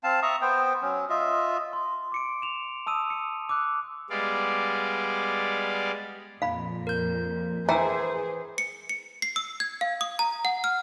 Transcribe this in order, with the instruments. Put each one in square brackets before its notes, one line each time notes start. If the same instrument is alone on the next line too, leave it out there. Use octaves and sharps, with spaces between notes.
[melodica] C4 F5 A5
E5 A#5 C#6 D#6
B3 C5 G5
F#3 C#4
F4 D#5 E5
[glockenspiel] C6
D6 C#7 D7
E7 F7
A5 D#6 E6 D#7
C#7
D6 E6 F#6
[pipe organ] G3 G#3 B3 D5 F5
[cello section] F2 A#2 [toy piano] F5 B5
[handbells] A#4 G6
[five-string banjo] E3 [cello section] G#4 C5 [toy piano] G5 A#5 E6
[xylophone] C#7
C#7
C7
E6
G#6
F5
D#6
A#5
F#5
F6